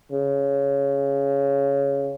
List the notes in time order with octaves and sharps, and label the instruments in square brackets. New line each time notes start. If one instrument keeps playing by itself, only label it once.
[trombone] C#3